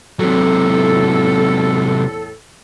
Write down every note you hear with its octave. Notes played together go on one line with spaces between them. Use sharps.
E2 A2 C3 F#3 A4